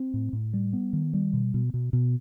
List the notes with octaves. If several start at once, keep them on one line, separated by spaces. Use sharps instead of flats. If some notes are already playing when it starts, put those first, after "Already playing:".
Already playing: C4
A2
A2
G3
B3
D#3
G3
B2
B2
B2
B2